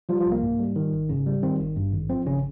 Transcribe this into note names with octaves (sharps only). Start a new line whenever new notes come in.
F3 G3 F4
F3 F4
C2
A#3
G#2
G3
D#3
G#1
G#2 C#3 C#4
G3
D#3 C4
G#1
G2
G#1
F3 C4
G#1 C#3 C#4